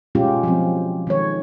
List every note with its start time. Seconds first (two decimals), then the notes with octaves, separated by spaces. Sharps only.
0.15 B2 G#3 C#4 F4 G4
0.43 F3 F#3 C4
1.07 D#3 G#3 C#5